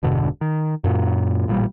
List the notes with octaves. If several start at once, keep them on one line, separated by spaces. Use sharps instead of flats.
E1 G2 B2 D3
D#3
F#2 A#2
A1 A#2 G3